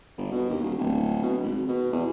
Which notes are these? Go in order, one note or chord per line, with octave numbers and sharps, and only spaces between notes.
G1
B2
D#2
D#1
D1
B2
G#1
B2
E2